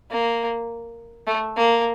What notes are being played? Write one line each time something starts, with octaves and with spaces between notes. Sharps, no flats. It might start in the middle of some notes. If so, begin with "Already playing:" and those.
A#3
A3
A#3